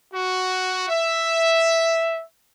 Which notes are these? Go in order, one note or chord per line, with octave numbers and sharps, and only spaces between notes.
F#4
E5